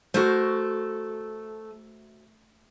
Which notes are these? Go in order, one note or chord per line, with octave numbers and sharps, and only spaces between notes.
A3 F#4 A#4 C5